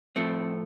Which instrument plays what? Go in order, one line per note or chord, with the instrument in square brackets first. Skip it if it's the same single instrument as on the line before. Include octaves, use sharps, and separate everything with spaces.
[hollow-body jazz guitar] A2 F3 A3 C4